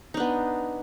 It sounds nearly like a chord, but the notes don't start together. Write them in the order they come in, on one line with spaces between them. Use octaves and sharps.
D#4 D4 B3